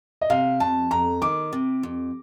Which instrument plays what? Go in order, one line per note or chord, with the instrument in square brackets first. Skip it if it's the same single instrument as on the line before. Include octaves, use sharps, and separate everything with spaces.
[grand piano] D#5
[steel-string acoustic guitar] C3 [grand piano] F5
[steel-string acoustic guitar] F2 [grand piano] A5
[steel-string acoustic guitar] F2 [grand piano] A#5
[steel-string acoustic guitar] D#3 [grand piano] D6
[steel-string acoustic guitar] C3
F2